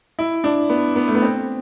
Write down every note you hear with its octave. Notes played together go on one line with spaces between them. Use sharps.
E4
D4
B3
B3
A3
B3
C4